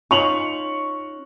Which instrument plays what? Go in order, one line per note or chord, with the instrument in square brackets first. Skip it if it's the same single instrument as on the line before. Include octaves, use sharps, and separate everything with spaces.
[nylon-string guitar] C#4 D#4 F4 [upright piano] C#6 F7 F#7